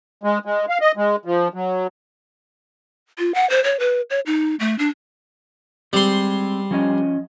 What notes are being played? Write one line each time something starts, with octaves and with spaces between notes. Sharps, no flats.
G#3
G#3
F5
D#5
G#3
F3
F#3
F4
F#5
C5
C#5
B4
C#5
D#4
A3
D4
G3 G#3 C4 C6
F3 C#4 D#5